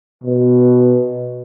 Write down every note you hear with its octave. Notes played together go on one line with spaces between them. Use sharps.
B2